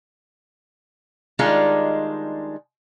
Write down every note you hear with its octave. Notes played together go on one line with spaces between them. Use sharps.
D#3 G3 G#3 D4 D#4 F4